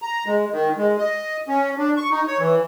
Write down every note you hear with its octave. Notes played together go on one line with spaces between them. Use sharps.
A#5
G#3
D#3
G#3
D#5
C#4
D4
C#6
D#4
C#5
E3